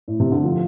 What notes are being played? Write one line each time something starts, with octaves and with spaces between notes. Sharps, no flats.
A2
C3
D3
F3